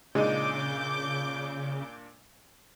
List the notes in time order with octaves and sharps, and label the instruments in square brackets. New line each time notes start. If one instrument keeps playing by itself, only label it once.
[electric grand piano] A#2 D4 D#7 [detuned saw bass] C#3 [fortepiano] G#3 D#4 [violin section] D6 G6